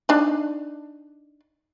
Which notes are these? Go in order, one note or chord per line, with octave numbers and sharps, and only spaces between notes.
D4 D#4